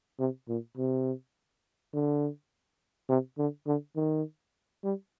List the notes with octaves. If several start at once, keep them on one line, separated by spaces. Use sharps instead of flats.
C3
A#2
C3
D3
C3
D3
D3
D#3
G3